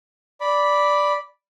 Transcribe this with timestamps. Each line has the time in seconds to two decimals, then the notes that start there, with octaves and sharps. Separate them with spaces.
0.41 D5 B5